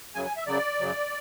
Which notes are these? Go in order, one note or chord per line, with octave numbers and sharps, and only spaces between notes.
F#2 C#3 F#3 G#5
G#5
E5
F#2 C#3 F#3 D5
F#2 C#3 F#3